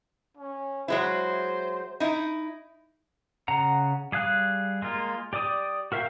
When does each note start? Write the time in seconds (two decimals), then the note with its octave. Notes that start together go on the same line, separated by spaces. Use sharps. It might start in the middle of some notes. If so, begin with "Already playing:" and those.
0.37 C#4
0.88 F#3 G#3 E4 C5
2.00 D#4 E4
3.48 C#3 F#5 A#5
4.12 G3 G#4 F5 F#6
4.82 G#3 A#3 F4
5.33 G4 D5 D6 D#6
5.92 F#4 A#4 E5 F5 G5